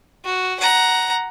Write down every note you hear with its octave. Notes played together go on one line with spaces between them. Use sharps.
F#4
F#5 A#5